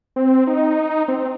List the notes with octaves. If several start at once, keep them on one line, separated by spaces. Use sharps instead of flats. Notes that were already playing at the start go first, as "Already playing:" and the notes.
C4
D#4
C4
C4